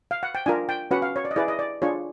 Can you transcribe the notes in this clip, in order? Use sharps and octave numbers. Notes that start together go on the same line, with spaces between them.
F5
F#5
G5
D4 F4 A#4 G#5
G5
C#4 F#4 B4 F#5
F5
C#5
D5
D#5
E4 G#4 B4 D5
D#5
D5
D4 F4 G#4 C#5